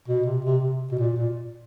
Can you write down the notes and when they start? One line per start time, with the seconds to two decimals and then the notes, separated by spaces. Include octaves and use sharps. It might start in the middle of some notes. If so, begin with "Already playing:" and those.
0.08 B2
0.26 C3
0.45 C3
0.63 C3
0.92 B2
0.99 A#2
1.16 A#2